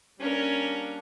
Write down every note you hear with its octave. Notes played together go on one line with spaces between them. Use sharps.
G3 A#3 C#4 D4 A#4